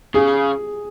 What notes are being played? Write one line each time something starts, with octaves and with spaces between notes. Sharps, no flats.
C#3 G#4